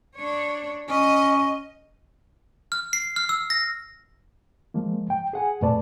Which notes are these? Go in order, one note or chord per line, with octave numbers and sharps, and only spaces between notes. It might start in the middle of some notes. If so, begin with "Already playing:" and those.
D4 C#5
C#4 D#5
F6
C7
F6
E6
A#6
F3 G#3 A#3
G5
G#4 F#5 G#5
F2 A#2 A3 B4 D5 A5